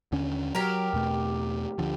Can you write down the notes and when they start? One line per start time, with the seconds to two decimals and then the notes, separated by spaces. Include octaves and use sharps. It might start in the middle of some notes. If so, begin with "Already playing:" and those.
0.12 D#2 D3 C#4
0.55 F#3 G4 A#4
0.93 E2 B2 A3
1.78 D2 D3 F3